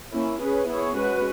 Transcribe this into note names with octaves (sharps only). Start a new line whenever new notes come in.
A#3 C#4 E4
C#4 G#4 B4
B3 E4 G#4 C#5
G#3 C#4 F#4 B4